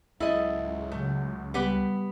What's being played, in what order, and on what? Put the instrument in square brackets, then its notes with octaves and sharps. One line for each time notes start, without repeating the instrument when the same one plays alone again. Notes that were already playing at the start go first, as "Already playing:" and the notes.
[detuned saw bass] C#2 [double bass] G#2 F#3 [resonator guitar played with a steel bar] E4 A4 D#5
[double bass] C#3 F#3 [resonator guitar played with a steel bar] A3
[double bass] G3 [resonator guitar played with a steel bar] B3 G4 B4